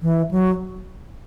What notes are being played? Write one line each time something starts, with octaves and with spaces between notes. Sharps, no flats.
E3
F#3